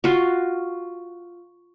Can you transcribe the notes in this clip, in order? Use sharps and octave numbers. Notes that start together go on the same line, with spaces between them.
F4 F#4